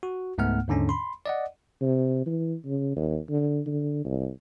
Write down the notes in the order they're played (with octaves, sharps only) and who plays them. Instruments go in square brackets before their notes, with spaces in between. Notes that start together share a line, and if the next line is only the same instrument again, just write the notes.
[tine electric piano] F#4
C#2 G#2 A3 B3 F#5 F6
D#2 G#2 D3 C#4 D4
B5 C6
D5 D#5 F#5
[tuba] C3
E3
C#3
D#2
D3
D3
C2